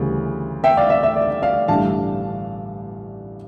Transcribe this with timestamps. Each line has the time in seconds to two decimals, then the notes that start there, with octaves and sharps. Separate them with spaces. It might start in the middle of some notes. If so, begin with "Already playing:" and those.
Already playing: D2 C#3 E3 G3
0.64 E5 G5
0.77 D5 F5
0.90 E5
1.03 E5
1.16 D5
1.42 D5 F5
1.68 A1 G2 D3 G3 D4 F5 A5